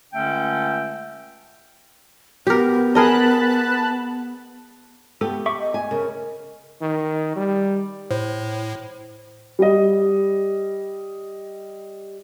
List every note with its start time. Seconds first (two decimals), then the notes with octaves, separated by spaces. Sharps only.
0.14 C#2 D3 A3 C#4 G5
2.47 B3 G4 A#4
2.95 G#4 A#4 D#5 A5 B5 F#6
5.21 A3 B3 G4 A4
5.46 E5 C#6 D6
5.60 D#5
5.74 G#5
5.91 C#3 A#4
6.82 D#3
7.36 G3
8.11 A2 C5
9.59 G3 D#5